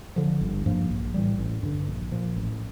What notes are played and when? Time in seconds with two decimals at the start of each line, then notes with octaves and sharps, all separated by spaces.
0.16 D3 F3
0.41 G1
0.66 G2 F3 A#3
0.90 A#1
1.14 A2 E3 G3
1.39 A1
1.63 G2 D3
1.87 A#1
2.12 A#2 F3
2.36 A1